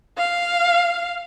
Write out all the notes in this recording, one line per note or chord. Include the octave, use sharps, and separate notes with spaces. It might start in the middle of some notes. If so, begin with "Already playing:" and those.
F5